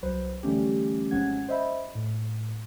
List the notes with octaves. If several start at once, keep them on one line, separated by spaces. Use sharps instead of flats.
C2 F#3 B4 C5
D3 E3 G3 A3 C#4 G4
G#1 F3 G#3 C#4 F#5 G#6
C5 D#5 E5 B5
A2